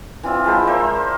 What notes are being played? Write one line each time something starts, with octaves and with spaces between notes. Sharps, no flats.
E3 C4 F4 E5
F3 G#3 B4 C5
A#4 C5 D5 E5